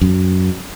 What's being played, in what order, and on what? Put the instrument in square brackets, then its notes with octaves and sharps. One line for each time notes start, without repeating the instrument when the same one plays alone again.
[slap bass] F#2